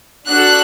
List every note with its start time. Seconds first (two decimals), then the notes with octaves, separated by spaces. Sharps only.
0.27 D4 F#4 A4 F#6